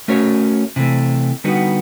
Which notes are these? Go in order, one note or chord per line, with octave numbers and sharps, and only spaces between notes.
A3 C#4 F#4 A#4 C#5
C3 E3 A3
D3 G3 B3 D#4 F#4